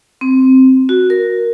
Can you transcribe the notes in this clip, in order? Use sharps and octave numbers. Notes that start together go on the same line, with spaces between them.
C4
F#4
A#4